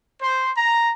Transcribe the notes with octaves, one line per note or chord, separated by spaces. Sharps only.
C5
A#5